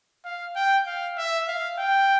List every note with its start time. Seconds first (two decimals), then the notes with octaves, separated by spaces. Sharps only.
0.25 F5
0.56 G5
0.86 F5
1.17 E5
1.48 F5
1.78 G5